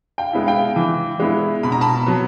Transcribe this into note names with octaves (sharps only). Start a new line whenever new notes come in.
F5 G5
G#3 B3 E4
F5 G5
E3
G#3 B3 E4
B2 B5
A#5
A5 B5
F#3 B3